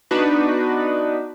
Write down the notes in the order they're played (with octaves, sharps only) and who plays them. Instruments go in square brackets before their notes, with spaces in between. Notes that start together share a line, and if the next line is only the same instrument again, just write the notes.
[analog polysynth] B3 D4 D#4 F#4 B4